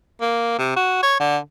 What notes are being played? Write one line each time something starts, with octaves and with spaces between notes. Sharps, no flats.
A#3
C3
F#4
C#5
D3